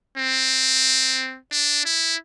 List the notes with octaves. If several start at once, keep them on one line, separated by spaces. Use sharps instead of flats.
C4
D4
E4